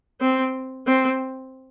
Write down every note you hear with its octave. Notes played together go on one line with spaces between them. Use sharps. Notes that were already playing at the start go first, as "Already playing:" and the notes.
C4
C4